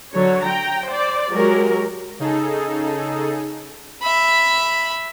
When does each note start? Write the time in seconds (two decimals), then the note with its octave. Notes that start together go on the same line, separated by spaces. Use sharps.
0.12 D3 F#3 C#5
0.43 G5 A#5
0.87 C5 D5
1.31 F#3 G#3 G4 A#4
2.20 C#3 D#4 G#4 A4
4.02 E5 B5